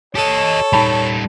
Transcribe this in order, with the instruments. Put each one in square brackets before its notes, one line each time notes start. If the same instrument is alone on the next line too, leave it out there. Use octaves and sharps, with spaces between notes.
[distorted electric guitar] G4 D#5 [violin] A4 [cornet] C#5
[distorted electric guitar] G3 D#4 [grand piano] A5 B5